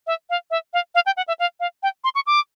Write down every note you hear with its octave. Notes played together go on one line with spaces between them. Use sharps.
E5
F5
E5
F5
F5
G5
F#5
E5
F5
F5
G5
C6
C#6
D6